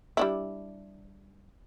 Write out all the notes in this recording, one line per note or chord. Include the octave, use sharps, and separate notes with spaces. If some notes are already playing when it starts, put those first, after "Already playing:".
G3 D4 E4